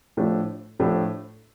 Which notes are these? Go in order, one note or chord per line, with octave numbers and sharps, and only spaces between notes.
A2 F3 A3 D4
A2 F3 A3 D4